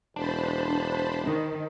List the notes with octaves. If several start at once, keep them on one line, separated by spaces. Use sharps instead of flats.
E1 D4 C5 A5 B5
D#3